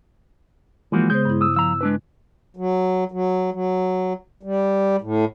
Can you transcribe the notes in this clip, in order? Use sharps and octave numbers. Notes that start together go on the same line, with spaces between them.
E3 F3 G#3 A#3 F#4
C#3 G#3 B3 C5 G6
G2 E4
D#6 E6
F3 A#5 E6
G#3 D4 B4
F#3
F#3
F#3
G3
A2